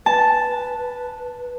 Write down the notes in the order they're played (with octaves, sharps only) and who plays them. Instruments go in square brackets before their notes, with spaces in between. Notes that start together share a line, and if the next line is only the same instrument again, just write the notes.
[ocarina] B4 [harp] A5